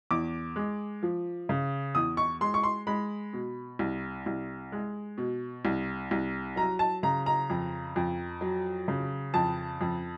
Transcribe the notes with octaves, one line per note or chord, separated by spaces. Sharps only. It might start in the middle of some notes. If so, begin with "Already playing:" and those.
E2 D6
G#3
F3
C#3
E2 D#6
C#6
G#3 C6
C#6
C6
G#3 B5
B2
C2
C2
G#3
B2
C2
C2
F#3 A#5
A5
C#3 A#5
A#5
F2
F2
F#3
C#3
F2 A5
F2